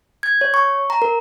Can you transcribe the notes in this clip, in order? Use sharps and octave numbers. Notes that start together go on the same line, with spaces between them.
G#6
C#5
C#6
A#5
A#4